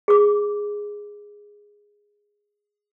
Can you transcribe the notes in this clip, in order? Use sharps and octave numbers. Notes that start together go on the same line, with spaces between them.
G#4 D6